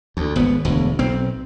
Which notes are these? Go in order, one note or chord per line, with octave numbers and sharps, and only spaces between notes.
D2
G#1 B3
E1 D2
B1 C4